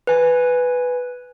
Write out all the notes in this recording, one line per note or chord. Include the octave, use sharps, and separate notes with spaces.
B4 G#5